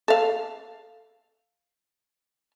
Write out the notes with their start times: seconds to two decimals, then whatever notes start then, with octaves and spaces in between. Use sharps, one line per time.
0.08 A4 F5